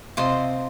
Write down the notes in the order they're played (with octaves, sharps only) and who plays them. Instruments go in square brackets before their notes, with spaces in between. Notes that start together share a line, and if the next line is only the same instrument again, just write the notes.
[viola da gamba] C3 [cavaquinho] F4 C5 D#5